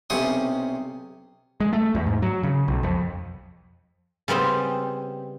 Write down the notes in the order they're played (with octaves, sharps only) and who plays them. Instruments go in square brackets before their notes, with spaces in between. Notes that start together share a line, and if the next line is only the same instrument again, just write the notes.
[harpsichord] B1 C3 C#4 C5 F#5 D#6
[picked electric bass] G#3
A3
E2
G#2
F#3
C#3
B1
F2
[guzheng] C#3 G3 B3 C4